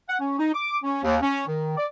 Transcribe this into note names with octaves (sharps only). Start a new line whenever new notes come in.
F#5
C#4
D#4
D6
C#4
D#2
C#4
D#3
D5